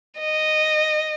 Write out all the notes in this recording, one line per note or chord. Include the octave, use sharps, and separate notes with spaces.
D#5